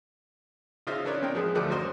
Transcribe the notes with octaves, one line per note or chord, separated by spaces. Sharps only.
C#3 D#4 F4 C5 D#5 E5
C#4 D4 A#4 B4 C#5 D5
C4 D#4 A#4 G5
F3 G#3 G#4 B4
D2 F3 G3 A3 D6 F#6
F#2 F#4 A#4 C5 D#5